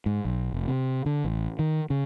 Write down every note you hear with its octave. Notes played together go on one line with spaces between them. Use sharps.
G#2
B1
F1
C3
D3
A1
D#3
C#3